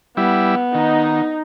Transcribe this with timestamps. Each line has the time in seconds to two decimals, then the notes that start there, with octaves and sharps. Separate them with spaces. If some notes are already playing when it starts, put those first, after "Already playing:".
0.17 G3 B3 E4
0.74 D#3 D#4